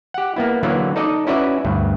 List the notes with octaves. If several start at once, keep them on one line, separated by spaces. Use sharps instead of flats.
G4 F#5
A#3 B3 E4
D3 E3 F#3 A#3 B3
D#4 A4 D5 D#5
C#4 E4 F#4 B4 D5 E5
D2 G2